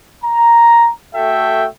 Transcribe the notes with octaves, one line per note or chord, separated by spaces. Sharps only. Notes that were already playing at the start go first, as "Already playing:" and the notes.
A#5
A3 F#4 A4 E5 G5